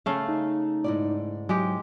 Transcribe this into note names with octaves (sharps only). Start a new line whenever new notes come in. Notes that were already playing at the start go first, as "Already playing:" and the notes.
C#3 A3 C#4 F5
D#4
G#2 E4 D5
F#3 G#3 G4